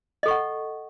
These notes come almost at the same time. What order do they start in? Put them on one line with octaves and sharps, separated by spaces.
D#5 A4 C#6 F#5